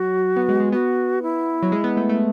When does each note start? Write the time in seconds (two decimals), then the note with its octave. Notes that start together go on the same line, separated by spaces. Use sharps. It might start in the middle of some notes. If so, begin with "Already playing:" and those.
Already playing: F#3 F#4
0.36 B3
0.49 G#3
0.60 G#3
0.72 B3 F#4
1.23 E4
1.63 F#3
1.72 G#3
1.84 B3
1.97 A3
2.09 A3